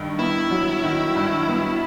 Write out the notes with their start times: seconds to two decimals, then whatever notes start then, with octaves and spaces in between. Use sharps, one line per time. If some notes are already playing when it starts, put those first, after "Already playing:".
Already playing: G2 D#3
0.19 B3 E4
0.51 F#3
0.83 D#3
1.16 G2
1.49 B3